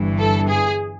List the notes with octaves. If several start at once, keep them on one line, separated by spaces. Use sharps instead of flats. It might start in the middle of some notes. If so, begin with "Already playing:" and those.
Already playing: G1 G2 E3
A4
G#4